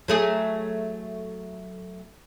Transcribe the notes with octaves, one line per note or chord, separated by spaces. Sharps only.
F#3 A3 G#4